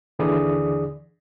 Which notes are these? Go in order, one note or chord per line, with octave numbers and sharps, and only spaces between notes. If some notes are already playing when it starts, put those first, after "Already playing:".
D#2 D3 E3 G#4 D5 D#6